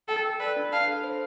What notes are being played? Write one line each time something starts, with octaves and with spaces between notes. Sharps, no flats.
A4 G5
A4
B4 D5
D4
F5 A5
A4
C5